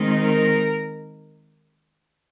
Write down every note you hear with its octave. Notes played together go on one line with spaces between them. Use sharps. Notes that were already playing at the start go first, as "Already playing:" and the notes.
Already playing: D#3 G#3 C4 D#4
A#4